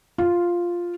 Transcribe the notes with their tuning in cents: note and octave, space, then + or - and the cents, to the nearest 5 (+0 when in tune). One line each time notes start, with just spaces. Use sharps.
F4 +0